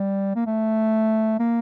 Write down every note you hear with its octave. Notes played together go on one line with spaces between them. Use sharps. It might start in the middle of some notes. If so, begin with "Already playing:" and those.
Already playing: G3
A#3
A3
A#3